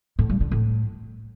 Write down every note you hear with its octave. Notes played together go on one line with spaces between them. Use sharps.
A2
G2
D3
A2